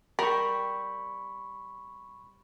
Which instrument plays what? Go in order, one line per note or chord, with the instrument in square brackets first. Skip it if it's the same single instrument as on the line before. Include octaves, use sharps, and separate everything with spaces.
[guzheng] G3 C4 C5 [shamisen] A#4 [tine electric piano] B5 C#6